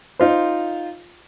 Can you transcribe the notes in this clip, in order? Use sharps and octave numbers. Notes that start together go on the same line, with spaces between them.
D#4 F4 C5